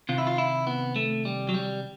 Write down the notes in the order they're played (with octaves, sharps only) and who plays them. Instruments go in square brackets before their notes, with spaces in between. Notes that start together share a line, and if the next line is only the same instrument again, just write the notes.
[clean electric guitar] C3 D#3 F4
E4
F4
E4
B3
A3
G3
F#3
G3